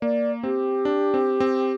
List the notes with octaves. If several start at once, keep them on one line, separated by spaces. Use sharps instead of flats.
A#3 D5
C4 G4
D4
C4
C4